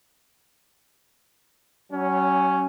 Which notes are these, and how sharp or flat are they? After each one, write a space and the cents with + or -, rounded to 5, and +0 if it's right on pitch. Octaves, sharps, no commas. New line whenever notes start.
F#3 +30 C#4 +0